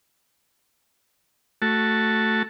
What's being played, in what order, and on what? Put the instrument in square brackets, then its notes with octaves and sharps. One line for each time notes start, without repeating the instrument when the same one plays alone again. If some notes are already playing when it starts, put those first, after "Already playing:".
[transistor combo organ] A3 F#4 A5